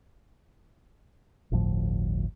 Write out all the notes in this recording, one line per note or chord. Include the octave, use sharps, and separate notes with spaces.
G1 D2 A2 F3